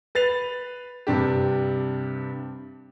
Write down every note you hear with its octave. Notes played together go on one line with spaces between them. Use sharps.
B4 A6 C7 F7
G2 C3 D4 G4